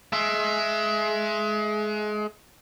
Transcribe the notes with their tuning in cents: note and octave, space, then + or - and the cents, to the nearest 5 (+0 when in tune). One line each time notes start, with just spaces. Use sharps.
G#3 +25 E5 +15